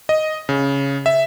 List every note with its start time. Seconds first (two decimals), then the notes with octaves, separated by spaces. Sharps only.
0.09 D#5
0.49 C#3
1.06 E5